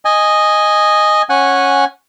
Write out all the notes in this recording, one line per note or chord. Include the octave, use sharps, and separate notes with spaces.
D#5 G#5
C#4 F#5 G#5